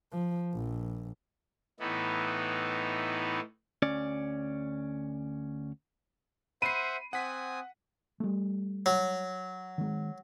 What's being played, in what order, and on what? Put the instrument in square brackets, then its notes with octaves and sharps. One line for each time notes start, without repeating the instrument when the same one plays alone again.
[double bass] F3
A#1
[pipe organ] A2 E3 B3 D#4
[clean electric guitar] D2 C#4 D5
[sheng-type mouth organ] C5 E5 F#5 [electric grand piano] B5 C7 [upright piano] D#7
[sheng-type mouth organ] C4 G#5 D#6 [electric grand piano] F#5 B6
[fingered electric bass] G3 A3
[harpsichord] F#3
[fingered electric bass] D#3 G#3